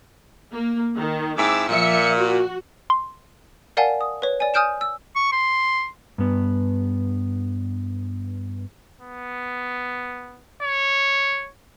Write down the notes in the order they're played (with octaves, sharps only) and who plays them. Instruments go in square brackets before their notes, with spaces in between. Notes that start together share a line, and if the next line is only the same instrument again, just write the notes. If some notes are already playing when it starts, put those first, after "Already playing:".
[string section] A#3
D#3
[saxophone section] G#2 C4 E4 [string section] D6 E6
[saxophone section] A#2 [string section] F3 E5 C#7
[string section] F#4
[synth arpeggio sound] C6
[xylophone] A#4 D5 F5 F#5 G#5 A5
D#6
B4 C#5
D5 G#5
G#5 D#6 F6 G6 D7 E7
E6
[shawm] C#6
C6
[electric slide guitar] G2 B3
[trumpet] B3
C#5